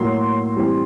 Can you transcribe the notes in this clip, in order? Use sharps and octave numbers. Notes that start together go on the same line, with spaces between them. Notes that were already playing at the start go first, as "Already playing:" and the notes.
Already playing: A2 F#3 A#3 C6
E3 G3 C4